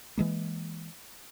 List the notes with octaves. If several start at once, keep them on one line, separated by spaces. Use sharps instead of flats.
E3 G#3 A#3